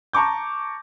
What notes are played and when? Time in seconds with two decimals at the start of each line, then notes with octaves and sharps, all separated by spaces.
0.13 A5 A#5 C#6 D6 G6